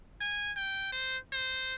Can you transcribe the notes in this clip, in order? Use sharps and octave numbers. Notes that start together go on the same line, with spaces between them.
G#5
G5
C5
C5